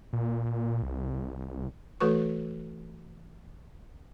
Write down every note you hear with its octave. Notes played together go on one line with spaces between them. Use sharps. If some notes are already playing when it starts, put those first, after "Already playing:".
A#2
C2
E3 A3 F#4 A4 B4 C#6